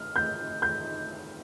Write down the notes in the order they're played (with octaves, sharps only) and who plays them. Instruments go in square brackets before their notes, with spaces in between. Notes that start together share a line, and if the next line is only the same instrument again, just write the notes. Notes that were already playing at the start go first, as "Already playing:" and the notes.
Already playing: [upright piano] F6
G6
G6